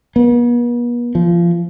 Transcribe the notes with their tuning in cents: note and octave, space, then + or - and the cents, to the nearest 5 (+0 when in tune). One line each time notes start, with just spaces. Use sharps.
B3 -45
F3 -25